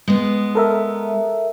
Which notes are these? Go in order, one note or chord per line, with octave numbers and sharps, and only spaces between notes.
G#3 B3
A4 A#4 E5